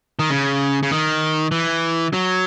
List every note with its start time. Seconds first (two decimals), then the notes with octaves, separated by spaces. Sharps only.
0.19 D#3
0.30 C#3
0.83 C#3
0.91 D#3
1.52 E3
2.13 F#3